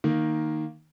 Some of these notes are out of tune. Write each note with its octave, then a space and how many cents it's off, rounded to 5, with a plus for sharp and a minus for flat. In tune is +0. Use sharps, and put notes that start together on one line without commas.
D#3 +0 A#3 +0